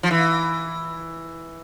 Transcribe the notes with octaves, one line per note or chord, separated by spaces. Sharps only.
F3
E3